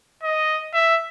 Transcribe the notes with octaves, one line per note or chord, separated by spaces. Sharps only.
D#5
E5